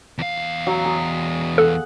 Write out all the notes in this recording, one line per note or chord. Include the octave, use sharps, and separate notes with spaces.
E2 F5
F#3
G#4
A4 F#5